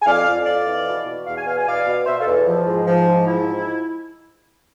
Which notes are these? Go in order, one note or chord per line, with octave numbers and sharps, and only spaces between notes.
G#5
F2 D5 F5
F2
F2 D5 F5
E3
B2
B2
E2 F5
G#5
B2 F5
G#5
B2 D5 F5
B2
B2 C5 E5
F4 A4
E2
F3
G#2
F3
G#2
F3 E4
G#2